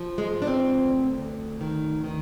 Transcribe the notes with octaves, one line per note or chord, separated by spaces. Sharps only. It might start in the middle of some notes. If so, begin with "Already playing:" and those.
Already playing: F3
G#3
G#2
D4
C4
D2
D2
D#3
D#3